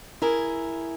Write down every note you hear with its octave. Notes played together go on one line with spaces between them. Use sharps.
E4 G#4 A#4